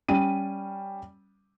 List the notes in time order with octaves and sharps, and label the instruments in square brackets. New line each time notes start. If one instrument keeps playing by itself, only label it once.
[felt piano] G3 C#4 D#7